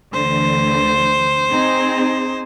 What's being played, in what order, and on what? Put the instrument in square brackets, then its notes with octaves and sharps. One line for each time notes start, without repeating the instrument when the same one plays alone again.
[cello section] D2 D3 E3 [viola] C5
[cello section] C4 D#4 G#4